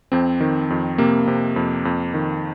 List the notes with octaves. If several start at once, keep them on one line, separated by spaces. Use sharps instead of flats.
F2 C4
D#3
F2
C3 A#3
C3
F2
F2
D#3